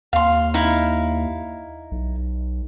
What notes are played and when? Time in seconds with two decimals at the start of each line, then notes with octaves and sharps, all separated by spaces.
0.13 D#2 F5 C6
0.54 D#4 E4 F5
1.91 B1